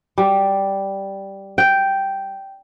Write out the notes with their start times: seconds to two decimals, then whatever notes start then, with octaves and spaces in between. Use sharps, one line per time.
0.18 G3
1.58 G5